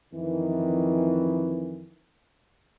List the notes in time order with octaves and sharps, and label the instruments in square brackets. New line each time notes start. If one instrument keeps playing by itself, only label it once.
[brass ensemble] F2 D#3 E3